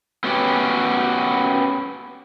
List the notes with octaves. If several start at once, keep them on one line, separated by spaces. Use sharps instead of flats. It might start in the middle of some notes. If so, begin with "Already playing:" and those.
B3 C#4 F#4 G4